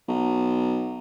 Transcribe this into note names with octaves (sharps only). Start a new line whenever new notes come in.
B1